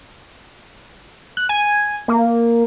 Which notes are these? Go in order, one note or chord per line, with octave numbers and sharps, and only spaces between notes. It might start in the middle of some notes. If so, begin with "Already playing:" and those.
F#6
G#5
A#3